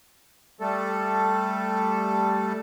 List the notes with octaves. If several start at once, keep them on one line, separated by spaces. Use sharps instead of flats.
G3 A3 A4